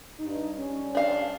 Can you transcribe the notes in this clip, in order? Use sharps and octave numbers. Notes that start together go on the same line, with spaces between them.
G2 D#4
G3 C#4
D4 F5